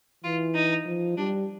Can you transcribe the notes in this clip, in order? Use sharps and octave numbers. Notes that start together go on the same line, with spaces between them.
E3 F4
D#4
F3
G3 D4